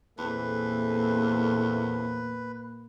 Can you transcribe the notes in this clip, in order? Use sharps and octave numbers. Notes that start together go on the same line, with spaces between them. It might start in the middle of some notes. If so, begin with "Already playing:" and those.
E2 A#2 A3 A#3 C4 A4 B4